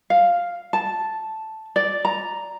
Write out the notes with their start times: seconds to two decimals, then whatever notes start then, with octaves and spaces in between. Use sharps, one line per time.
0.10 F5
0.73 A5
1.76 D5
2.05 A#5